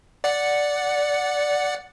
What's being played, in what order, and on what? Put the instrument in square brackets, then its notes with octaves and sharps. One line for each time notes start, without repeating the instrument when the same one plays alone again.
[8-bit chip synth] D5 F#5 C#7